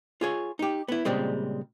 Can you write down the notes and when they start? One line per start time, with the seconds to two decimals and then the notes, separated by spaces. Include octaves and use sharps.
0.21 F4 G#4 C#5
0.59 D#4 G4
0.88 B3 E4
1.05 A#2 C#3 G3 G#3 C4